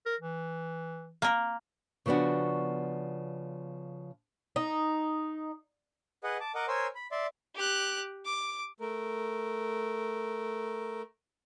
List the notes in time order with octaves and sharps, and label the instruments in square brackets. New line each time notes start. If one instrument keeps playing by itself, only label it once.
[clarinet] A#4
E3
[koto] A#3 A#4
[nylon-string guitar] C#3 F3 B3 D4 F#4
[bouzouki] D#4
[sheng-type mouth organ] G#4 B4 D#5 F#5
A5 D6
A#4 D#5 F#5 D6
A#4 C5 C#5 G#5 C6 E6
B5
D5 E5 C6
[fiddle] G4 F#6
D6
[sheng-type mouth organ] A3 A#4